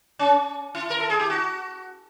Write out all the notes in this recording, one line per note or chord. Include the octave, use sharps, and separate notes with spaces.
C#4
E4
A#4
A4
G#4
G4
F#4